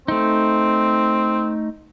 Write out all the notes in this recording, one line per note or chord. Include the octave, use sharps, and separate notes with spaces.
A3 C4 D#4